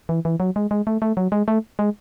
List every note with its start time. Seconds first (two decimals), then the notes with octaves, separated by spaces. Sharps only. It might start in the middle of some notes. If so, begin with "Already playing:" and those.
0.09 E3
0.25 E3
0.40 F#3
0.56 G#3
0.71 G#3
0.87 A3
1.02 A3
1.17 F#3
1.32 G#3
1.48 A3
1.79 G#3